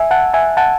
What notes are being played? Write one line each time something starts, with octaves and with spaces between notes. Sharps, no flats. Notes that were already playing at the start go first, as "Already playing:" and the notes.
Already playing: E5 G#5
F#5 A5
E5 G#5
F#5 A5